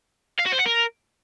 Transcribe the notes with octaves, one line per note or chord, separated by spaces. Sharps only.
F5
F#4
C5
F#5
A#4